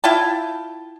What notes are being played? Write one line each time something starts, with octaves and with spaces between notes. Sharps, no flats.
E4 F4 G5 A5